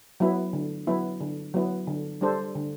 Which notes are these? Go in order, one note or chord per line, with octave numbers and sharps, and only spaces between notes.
F#3 B3 E4
D3
F#3 B3 E4
D3
F#3 B3 E4
D3
G3 D4 A4 C5
D3